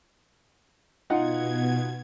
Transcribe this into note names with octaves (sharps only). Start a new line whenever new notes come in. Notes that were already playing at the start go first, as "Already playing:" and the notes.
B2 D#4 F4 F#5 G#6